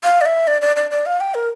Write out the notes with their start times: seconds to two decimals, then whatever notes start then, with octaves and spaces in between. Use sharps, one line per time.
0.04 F5
0.21 D5
0.26 E5
0.47 D5
0.62 D5
0.76 D5
0.91 D5
1.06 F5
1.21 G5
1.34 A#4